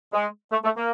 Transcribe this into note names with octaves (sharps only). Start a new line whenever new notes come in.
G#3
A3
A3
A#3